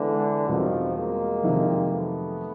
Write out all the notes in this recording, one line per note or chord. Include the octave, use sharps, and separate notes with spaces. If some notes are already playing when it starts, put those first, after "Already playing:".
Already playing: D3 E3 G#3 B3
E2 B2 D#3 F3 G3 C4 F4
G#3 A#3
F2 C3 D#3 F#3
A3 B3